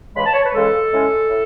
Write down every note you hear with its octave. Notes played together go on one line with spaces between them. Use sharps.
C#2 C#3 E3 G#3 B5
A5
C#5
B4
C#2 C#3 E3 G#3 A4
A2 G#3 C#4
A2